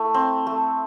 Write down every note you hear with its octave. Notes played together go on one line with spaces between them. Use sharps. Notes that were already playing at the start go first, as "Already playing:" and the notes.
Already playing: A3 E4
C4
A3